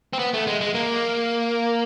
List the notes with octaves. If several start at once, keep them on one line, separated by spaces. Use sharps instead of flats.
C4
B3
A3
G#3
G#3
A#3